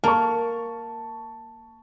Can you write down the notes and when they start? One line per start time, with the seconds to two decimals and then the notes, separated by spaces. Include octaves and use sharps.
0.04 A#3 A5 C#6